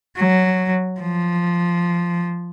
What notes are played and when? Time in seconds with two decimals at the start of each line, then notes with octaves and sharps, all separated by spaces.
0.17 F#3
1.00 F3